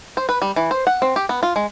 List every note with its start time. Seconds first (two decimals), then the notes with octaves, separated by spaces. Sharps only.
0.17 C5
0.29 B4
0.42 G3
0.56 E3
0.71 C5
0.87 F#5
1.02 C4
1.16 G4
1.29 B3
1.43 F4
1.56 G#3